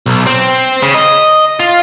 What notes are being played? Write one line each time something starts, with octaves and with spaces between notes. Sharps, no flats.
B1
C4
C#3
D#5
F4